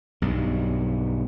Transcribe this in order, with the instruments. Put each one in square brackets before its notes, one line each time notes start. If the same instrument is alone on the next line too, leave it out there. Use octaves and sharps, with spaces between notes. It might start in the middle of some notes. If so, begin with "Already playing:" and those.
[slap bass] B1 G2